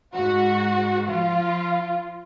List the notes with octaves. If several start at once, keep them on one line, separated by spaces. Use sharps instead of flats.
G#2 F#4
F3 F4